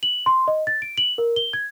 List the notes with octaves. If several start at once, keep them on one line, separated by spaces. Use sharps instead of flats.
F#7
C6
D#5
A6
D7
F#7
A#4
G7
G#6